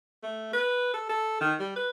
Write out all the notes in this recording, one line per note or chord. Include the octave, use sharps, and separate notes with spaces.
A3
B4
A4
A4
D#3
G3
B4